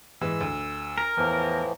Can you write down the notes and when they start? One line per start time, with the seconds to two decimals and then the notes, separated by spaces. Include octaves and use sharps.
0.21 G#2 E3 E6
0.41 D2
0.98 A#4 A#5
1.17 E2 A2 E3 F3